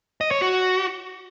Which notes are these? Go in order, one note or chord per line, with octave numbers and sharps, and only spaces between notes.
D#5
C#5
F#4